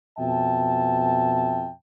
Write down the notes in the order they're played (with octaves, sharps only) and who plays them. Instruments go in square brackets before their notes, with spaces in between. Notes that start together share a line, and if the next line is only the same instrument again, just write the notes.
[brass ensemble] F2 B2 E5 G5 A5